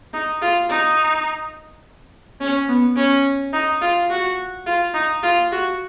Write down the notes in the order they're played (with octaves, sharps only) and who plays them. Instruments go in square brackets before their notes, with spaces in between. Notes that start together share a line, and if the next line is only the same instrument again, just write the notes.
[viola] D#4
F4
D#4
C#4
B3
C#4
D#4
F4
F#4
F4
D#4
F4
F#4